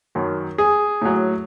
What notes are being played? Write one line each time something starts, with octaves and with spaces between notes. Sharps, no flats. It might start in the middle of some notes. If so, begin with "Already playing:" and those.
F#2 D#3 F#3
G#4
A2 F#3